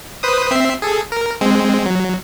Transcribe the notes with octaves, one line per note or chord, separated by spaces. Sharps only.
B4 C5 D#6
C4 E5 C7
G#4 A4
A#4
G#3 C4
F#3